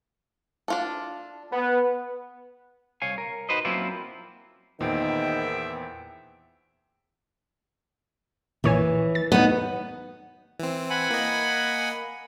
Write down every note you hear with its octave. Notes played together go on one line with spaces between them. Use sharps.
D4 F4 A4
B3
C2 C#5 F5 G#5
A#4
D#4 F#4 B4 C5 D#5
F#3 A#3 C4 C#4 E4 F4
E2 A#2 D#3 B3 G#4 C5 E5 G5
A#1 E3 C#5 G#5
A6
B3 D#4 C#5
E3 C4
F#5 G#5 B5
A#3 D#5